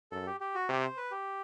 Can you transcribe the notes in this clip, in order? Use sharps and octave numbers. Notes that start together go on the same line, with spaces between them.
F#2 A4
G4
G4
F#4
C3 G4
C5
B4
G4